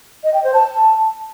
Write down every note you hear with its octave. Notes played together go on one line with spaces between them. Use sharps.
D#5
G5
C5
A5